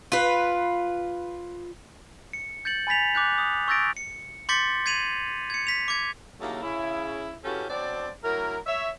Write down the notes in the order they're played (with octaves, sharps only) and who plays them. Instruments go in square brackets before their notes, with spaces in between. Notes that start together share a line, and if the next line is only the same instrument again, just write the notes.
[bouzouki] F4 B4
[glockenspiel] C#7
G6 A6 C#7 F#7
G#5 B5 A6 B6 F7
D6 F#6 G6
D#6
C#6 E6 G6 A6 A#6 D7
C#7
C6 D6 G6 A6 B6 C#7
G#6 C7 D#7 F7 F#7
G#6 C#7
B6 F7
D6 G#6
[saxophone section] D#2 A2 C#3 F#3 A3 A#3
C#3 E4
C#3 E3 C#4 F#4 G4 A4
B2 F#3 C4 D4 D5
D2 F#3 E4 A#4
C#5 E5